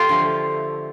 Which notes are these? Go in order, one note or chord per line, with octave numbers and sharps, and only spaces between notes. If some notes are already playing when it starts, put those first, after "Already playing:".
Already playing: F4 G4 A4
D3 F3 A3